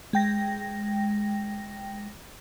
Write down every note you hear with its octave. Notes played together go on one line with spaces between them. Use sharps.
G#3 G5 A#6